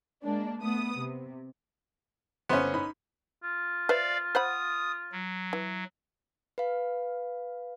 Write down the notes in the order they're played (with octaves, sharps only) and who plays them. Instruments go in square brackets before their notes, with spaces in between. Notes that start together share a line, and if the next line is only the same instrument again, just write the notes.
[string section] G#3 A#3 D4
A3 B3 D#6
C3
[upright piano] G1 C5 [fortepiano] B3 C#4
[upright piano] D#4 B5
[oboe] F4
[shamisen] B4 C5 E5 [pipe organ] D5 F5
[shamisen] C5 F#5 B5 [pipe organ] D#6
[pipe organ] F#3
[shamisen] E3
[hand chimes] B4 F5